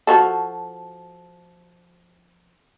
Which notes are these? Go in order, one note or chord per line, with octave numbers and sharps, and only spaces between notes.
F3 F#4 A4